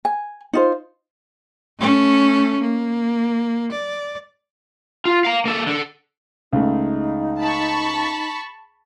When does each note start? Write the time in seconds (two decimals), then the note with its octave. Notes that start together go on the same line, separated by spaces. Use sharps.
0.05 G#5
0.53 D#4 F4 C5
1.79 A3 C#4
2.61 A#3
3.72 D5
5.05 F4
5.25 F5 A#5
5.45 A#3 A4
5.67 D3 A4
6.53 C#2 A3 D#4
7.40 A5 B5 C#6